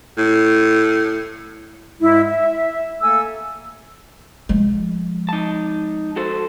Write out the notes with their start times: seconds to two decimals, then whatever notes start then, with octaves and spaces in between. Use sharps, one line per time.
0.17 A2
2.00 G#2 G#3 E4
2.28 E5
3.01 A3 A#3 A4 G#5 E6
4.49 F3 G#3
5.29 D#4 A5
6.16 F#4 A4 C5